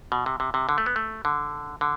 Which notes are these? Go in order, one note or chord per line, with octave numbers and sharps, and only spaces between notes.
B2
C3
C3
C3
D3
A3
B3
A3
D3
D3